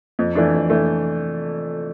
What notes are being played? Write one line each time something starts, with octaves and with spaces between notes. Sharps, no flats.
F2
E3 A3 D4
F2
E3 A3 D4